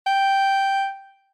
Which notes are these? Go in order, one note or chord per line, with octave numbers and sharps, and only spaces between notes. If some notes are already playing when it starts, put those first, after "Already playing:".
G5